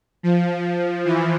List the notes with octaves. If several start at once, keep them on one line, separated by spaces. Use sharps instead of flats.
F3
E3